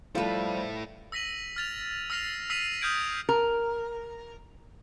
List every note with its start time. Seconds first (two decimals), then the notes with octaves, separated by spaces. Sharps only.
0.15 F3 G3 A3 E4 A4 B4
1.12 E6 A#6 B6 D#7 F#7
1.56 F6 A6 F7
2.10 E6 F6 A#6 C7 F7
2.50 E6 B6 C7 D#7 F#7
2.81 D#6 F6 G6 G#6 D7 F#7
3.29 A#4